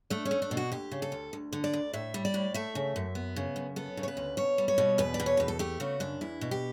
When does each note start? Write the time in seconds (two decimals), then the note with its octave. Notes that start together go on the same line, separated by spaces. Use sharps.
0.10 A3 D4
0.25 C#4
0.31 A3
0.42 D4
0.51 B2
0.57 F#4
0.72 D2 G4
0.91 C#3
1.02 A4
1.12 D2
1.33 D2
1.53 D3
1.64 D5
1.73 D2
1.93 A2 E5
2.14 G3
2.25 D5
2.34 A2
2.54 A3 E5
2.75 C#3
2.96 F#2
3.15 B3
3.36 C#3
3.56 F#2
3.76 B3 A4
3.97 C#3
4.03 C#5
4.08 B4
4.17 D2
4.37 B2 C#5
4.58 G3
4.68 C#5
4.78 B2
4.98 E2 B4
5.14 D5
5.20 B2
5.26 C#5
5.37 E2 B4
5.48 A4
5.59 A3 G4
5.80 C#3 F#4
6.00 F#2 D4
6.21 E2 E4
6.41 B2
6.51 G4